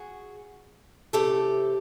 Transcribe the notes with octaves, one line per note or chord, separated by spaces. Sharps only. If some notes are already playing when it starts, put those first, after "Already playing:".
Already playing: F#4 G#4
C3 E3 A3 G4 A4